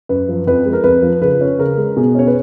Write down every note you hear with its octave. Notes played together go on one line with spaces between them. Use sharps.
F#2 B4
F3
F2 B4
G#3
A#4
F2 B4
F3
C#3 B4
C#4
C#3 A#4
G#3
B2 G#4
C#4 C#5
B4